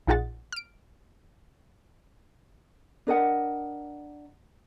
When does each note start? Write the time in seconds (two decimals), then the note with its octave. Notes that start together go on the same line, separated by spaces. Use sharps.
0.07 A#1 D#4 F4 G#4 F#5 A6
0.52 F6 D7
3.07 D4 A#4 D#5 F#5